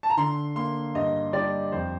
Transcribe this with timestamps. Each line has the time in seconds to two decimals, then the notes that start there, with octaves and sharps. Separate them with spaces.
0.03 A5
0.10 A#5
0.17 D3 C6
0.56 A#3 C6
0.95 G2 D#5
1.33 G3 D5
1.72 F2 C5